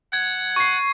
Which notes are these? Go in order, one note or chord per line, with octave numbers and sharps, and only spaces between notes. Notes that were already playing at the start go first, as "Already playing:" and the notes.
F#5 G#6
C#6 C7